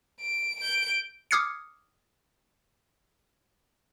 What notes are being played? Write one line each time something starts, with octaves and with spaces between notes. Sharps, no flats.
D7
G6 D7
D6 D#6 F6 G#6 C7 C#7